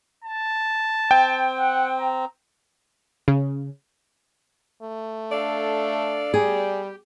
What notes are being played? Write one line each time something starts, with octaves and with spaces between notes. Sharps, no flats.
A5
C4 G5
F#5
A#5
C#3
A3
D4 A4 D5 F5
G3 G4 G#4